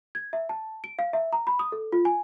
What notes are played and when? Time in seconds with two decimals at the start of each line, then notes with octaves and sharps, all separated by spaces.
0.15 G#6
0.33 E5
0.49 A5
0.84 D7
0.99 F5
1.13 E5
1.33 A#5
1.47 B5
1.59 D#6
1.72 A4
1.92 F4
2.05 G#5